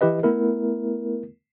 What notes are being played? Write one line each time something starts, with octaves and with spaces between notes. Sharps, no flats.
E3 E4 G4 B4 D#5
A3 B3 E4 A#4